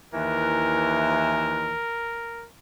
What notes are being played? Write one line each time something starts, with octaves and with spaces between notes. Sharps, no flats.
D#2 E3 A#4